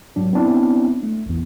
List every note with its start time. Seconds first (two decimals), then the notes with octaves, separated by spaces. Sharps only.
0.16 G#2 F#3 D4
0.33 B3 C4 D4 E4
1.03 A3
1.26 A1 E2